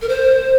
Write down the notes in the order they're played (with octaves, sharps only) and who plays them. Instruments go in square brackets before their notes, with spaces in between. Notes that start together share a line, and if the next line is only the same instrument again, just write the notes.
[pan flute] A#4
C5